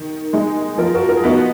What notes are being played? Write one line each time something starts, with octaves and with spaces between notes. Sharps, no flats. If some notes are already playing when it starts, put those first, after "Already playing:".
Already playing: D#3
G#3 D#4
F3 A#4
G#4
F#4 A#4
A#4
G#4
B3 D#4 F#4 A#4